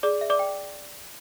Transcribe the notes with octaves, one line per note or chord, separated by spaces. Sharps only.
G#4 D5 D6
E5
D5 D6
G5